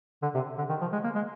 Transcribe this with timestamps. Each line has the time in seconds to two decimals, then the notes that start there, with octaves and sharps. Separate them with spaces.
0.23 D3
0.35 C3
0.58 D3
0.69 D#3
0.81 F3
0.93 G#3
1.04 A#3
1.15 G#3